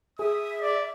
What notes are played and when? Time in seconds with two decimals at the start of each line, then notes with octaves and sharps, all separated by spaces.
0.19 G#4 E5 D#6
0.61 D5